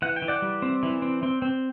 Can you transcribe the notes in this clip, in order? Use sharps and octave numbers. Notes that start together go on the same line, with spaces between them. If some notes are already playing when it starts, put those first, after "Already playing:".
E3 F#5
G5
E3
D5 F#5
G3
C4
E3
C4
C4
C4